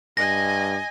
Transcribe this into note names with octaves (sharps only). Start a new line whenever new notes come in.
G2 D#5 G#5 A#6